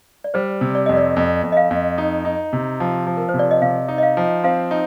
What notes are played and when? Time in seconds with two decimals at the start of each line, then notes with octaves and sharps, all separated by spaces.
0.24 D5
0.34 G3 C5
0.61 C3
0.75 D5
0.86 F2 D#5
0.97 D5
1.17 F2
1.44 F2
1.52 D#5
1.57 F5
1.71 F2
1.98 D#4
2.25 D#4
2.53 C3
2.80 F3
3.07 F3
3.17 A#4
3.29 C5
3.34 C3
3.39 D5
3.51 D#5
3.62 C3 F5
3.88 D#4
3.98 D#5
4.03 F5
4.17 F3
4.44 C4 F5
4.71 D#4